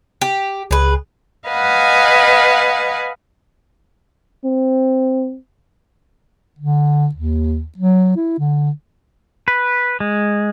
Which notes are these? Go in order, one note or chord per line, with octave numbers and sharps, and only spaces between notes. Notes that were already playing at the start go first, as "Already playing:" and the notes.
G4
C#2 G#4 B4
B4 D#5 F5 F#5 G#5
C4
D3
D#2
F#3
E4
D3
B4
G#3